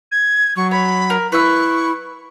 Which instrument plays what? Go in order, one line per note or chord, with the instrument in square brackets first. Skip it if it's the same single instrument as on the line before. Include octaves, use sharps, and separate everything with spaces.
[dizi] G#6
[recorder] F#3 [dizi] C#6
[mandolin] C#5 [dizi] B5
[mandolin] A#4
[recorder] E4 [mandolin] B4 E6 [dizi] C#6